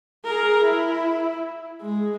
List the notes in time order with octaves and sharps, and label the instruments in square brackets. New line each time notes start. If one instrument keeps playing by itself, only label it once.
[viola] G#4 A#4
E4
G#3